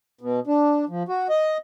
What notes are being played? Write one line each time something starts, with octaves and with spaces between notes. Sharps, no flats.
B2
D4
F3
F#4
D#5